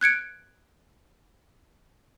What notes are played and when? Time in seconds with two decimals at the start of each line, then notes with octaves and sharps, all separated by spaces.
0.01 F#6 G#6 C#7 D7